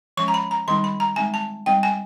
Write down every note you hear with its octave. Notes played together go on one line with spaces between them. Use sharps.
F3 G#3 C#4 C#6
A#5
B5
A#5
D#3 G3 C4 D#4 C6
B5
A#5
G#3 C4 D#4 G#5
A5
G3 C4 D#4 G5
G#5